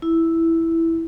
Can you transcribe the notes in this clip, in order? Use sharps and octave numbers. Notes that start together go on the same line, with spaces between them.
E4